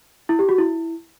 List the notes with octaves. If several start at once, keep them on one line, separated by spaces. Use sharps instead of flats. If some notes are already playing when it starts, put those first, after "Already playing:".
E4
G4
F#4
E4